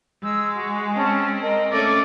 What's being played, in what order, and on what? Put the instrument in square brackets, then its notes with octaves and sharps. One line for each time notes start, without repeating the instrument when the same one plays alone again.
[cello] G#3 [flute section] E6
[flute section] F#4
[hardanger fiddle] C4 [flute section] C#4 A5
[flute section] A#4 D#5
[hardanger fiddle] A3 C#4 [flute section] A4 D6 [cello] D5